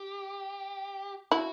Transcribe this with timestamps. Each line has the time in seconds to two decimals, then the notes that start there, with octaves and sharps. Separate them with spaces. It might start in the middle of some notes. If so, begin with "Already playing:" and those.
Already playing: G4
1.32 E4 F#4